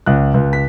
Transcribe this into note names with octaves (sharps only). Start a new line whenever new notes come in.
C#2 F#6
C#2
B6